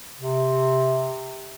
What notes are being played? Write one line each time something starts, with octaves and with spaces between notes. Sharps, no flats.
C3